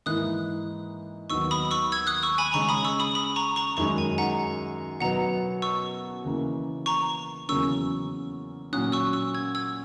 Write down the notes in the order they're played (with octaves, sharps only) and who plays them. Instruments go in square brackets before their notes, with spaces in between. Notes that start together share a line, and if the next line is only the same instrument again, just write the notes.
[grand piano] G#2 E3 A#3 E4 [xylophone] D#6 F#6
[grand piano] D#2 D#3 F#3 B3 [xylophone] C#6 E6
[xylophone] B5 D#6
C#6 E6
E6 G#6
D#6 F#6
C#6 E6
G#5 B5
[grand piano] C#3 G#3 C#4 [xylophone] A#5 C#6
[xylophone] B5 D#6
C#6 E6
B5 D#6
B5 D#6
A#5 C#6
A#5 C#6
[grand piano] F#2 D#3 G#3 D#4 [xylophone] A#5 C#6
[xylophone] G#5
F#5 A#5
[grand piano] B2 F#3 B3 [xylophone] F#5 A#5
[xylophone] C#6 E6
[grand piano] C#3 E3 A#3
[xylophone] A#5 C#6
[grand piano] E2 C#3 F#3 A#3 C#4 [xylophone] C#6 E6
[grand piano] A#2 F#3 C#4 [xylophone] D#6 F#6
[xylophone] C#6 E6
C#6 E6
E6 G#6
E6 G#6